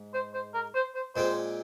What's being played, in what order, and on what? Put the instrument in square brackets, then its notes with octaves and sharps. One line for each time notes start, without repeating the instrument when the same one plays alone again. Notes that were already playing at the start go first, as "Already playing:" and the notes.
Already playing: [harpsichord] G#2
[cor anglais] C5
C5
A#4
C5
C5
[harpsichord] A#2 G#3 C4 [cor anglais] C5